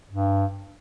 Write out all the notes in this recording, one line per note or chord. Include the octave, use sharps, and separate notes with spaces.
G2